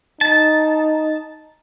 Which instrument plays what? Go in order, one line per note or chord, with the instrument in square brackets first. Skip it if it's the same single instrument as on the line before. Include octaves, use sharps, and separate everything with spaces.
[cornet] D#4 [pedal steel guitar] A5